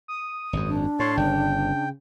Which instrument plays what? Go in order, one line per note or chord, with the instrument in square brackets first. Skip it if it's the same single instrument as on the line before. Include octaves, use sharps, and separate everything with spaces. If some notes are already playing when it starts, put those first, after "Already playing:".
[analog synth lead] D#6
[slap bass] G#1 F#2
[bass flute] D4
[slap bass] A2 [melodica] C#5 A5 [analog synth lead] C6
[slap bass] G1 [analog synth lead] C#3 [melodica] G5